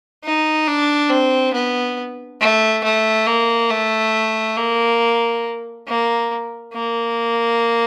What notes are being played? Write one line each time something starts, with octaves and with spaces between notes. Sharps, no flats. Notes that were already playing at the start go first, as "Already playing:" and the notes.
D#4
D4
C4
B3
A3
A3
A#3
A3
A#3
A#3
A#3